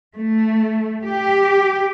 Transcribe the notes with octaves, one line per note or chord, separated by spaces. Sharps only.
A3
G4